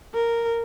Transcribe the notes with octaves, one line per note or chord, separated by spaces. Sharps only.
A#4